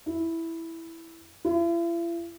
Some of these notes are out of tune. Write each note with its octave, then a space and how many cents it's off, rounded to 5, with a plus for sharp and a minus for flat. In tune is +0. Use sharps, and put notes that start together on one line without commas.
E4 +0
E4 +45